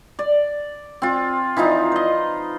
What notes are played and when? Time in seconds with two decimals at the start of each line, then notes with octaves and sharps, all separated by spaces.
0.19 D5
1.02 C4 F4
1.57 E3 F3 D#4 F4
1.92 B4 D#5